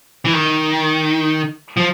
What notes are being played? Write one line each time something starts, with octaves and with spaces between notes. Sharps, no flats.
E3
D#3
F3